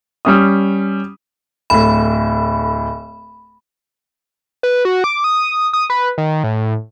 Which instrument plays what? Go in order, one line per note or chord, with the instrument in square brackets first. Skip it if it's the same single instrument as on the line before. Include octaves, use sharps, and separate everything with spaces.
[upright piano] G3 C#4 D#6
[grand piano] D1 A2 [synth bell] B5
[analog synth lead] B4
F#4
D6
D#6
D#6
B4
D#3
A2